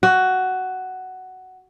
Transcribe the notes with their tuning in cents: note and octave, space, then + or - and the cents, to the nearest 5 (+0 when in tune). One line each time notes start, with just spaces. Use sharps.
F#4 +10